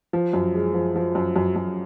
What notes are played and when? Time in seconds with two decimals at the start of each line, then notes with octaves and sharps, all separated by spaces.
0.13 F3
0.33 F#2
0.54 G#3
0.74 F3
0.96 F3
1.15 F#2
1.36 F#2
1.56 F#2